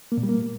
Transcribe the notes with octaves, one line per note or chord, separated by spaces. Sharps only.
A#3
A#2
G3
A#3